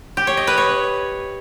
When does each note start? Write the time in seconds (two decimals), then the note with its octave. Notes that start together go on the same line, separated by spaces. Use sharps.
0.17 G4
0.27 C#5
0.37 D#5
0.47 B4
0.58 C#5